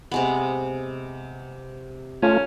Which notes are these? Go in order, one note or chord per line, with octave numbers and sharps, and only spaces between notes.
C3 G#3 B3
A3 C#4 F4